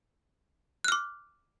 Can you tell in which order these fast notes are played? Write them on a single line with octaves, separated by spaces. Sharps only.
F#6 F6 D6